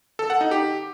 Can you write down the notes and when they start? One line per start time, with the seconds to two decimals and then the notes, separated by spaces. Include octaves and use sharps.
0.19 A4
0.30 F#5
0.41 D#4
0.51 G4